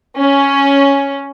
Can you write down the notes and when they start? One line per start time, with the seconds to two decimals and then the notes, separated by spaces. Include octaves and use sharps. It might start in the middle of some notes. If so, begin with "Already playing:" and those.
0.18 C#4